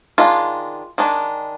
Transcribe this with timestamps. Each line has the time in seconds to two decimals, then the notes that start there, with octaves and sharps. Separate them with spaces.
0.18 D#3 G#3 D4 F4
0.98 D#3 G#3 D4